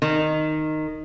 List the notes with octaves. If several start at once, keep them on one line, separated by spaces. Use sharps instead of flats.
D#3